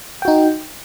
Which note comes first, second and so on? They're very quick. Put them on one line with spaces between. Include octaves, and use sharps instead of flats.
G5 F#4 D#4